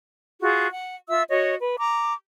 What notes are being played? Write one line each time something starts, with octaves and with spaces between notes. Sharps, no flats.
F4 F#4 G#4
F#5
F4 E5 E6
F#4 C#5 D#5
B4
A#5 D6